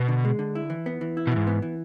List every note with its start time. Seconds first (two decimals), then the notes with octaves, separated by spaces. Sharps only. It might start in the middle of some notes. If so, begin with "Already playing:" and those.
Already playing: B2 B3
0.08 D3
0.25 G#3
0.39 D3
0.55 E4
0.70 E3
0.86 B3
1.01 E3
1.17 E4
1.27 B2
1.32 G#2 E3
1.47 B3
1.62 E3